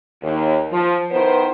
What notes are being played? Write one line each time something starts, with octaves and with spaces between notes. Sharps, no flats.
D#2
F3
D#3 B3 E4 B4 C5